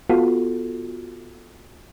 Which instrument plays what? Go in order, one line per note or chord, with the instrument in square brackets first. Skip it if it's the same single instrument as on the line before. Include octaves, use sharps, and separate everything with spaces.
[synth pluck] B3 F4 F#4 A4